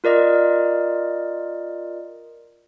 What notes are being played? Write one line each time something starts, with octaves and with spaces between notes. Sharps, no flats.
F4 A#4 D5 D#5